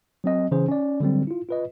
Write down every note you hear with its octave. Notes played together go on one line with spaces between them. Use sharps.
F#3 C4 D#5
C#3 E3 C#4 G#4 C5
C#4 D5
D3 F#3 G3 C4
E4 F4
F4 B4 D#5